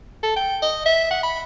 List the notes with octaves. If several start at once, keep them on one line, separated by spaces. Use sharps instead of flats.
A4
G5
D#5
E5
F#5
B5